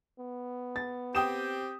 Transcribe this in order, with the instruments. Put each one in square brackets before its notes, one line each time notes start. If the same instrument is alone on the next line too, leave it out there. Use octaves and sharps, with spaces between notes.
[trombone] B3
[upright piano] A6
[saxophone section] C4 G4 [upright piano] G5 D#6 E7